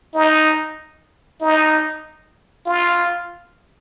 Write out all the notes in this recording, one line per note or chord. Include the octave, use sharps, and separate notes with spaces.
D#4
D#4
F4